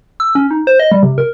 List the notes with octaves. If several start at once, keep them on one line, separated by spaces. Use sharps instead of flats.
E6
C#4
D#4
C5
D#5
G3
C3
A#4